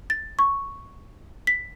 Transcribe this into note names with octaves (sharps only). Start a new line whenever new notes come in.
A6
C#6
B6